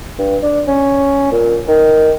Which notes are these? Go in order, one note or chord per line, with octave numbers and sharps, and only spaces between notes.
G2
D4
C#4
A#2
D#3